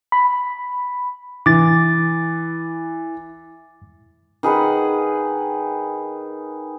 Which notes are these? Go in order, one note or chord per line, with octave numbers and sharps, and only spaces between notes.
B5
E3 D6 A6
D#3 G#4 B4 F#5